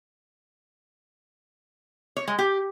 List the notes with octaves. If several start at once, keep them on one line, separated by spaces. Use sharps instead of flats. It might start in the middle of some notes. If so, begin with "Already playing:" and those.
C#5
G#3
G4